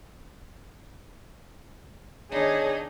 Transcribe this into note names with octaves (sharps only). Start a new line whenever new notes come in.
D#3 B3 D4 D#4 G#4 C#5